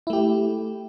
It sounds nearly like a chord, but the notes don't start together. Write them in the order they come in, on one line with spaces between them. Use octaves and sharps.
E4 A3 G4